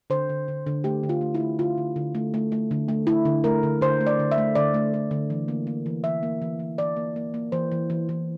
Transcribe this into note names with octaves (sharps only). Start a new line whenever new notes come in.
D3 C5
D3
D3
D3
A3 G4
D3
F4
A3
E4
A3
D3 F4
D3
D3
A3
A3
A3
D3
A3
A3 E4
D3
A3 A#4
D3
D3 C5
A3
D5
D3
E5
A3
D3 D5
A3
A3
D3
E3
A#3
A#3
E3
E3 E5
A#3
E3
E3
E3 D5
A#3
A#3
A#3
E3 C5
E3
E3
E3